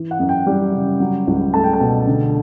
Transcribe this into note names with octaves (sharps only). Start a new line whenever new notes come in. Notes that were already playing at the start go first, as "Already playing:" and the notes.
Already playing: E3
F#5
F#2
G5
G3
C#3
F#3
C#2
A3 A5
G5
A5
B2
D3